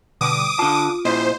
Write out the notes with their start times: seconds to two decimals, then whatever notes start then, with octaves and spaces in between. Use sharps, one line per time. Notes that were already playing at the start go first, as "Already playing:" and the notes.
0.21 B2 D3 G3 D6 D#6
0.59 D3 F4 A5
1.05 A#2 E4 C5 D#5